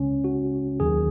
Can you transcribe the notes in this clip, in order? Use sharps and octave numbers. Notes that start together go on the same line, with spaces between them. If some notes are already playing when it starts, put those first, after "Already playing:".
Already playing: C#2 C#3 G#3 C#4
F#4
D#2 D#3 F#3 G#4